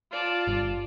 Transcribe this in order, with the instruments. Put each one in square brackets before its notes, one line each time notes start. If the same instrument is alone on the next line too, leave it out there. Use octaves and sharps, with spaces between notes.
[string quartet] F4 D5 A5
[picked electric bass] G1